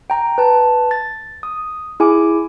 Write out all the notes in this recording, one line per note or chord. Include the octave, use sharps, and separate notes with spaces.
G5 A#5
B4 A5
A6
D#6
E4 G#4 G#5 D6